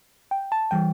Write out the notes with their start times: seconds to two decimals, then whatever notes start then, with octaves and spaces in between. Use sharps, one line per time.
0.31 G5
0.52 A5
0.71 E3 G3 G5